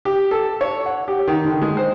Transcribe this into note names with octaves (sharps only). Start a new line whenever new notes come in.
G4
A4
C#5
F#5
G4
D#3
D3
G#3
C5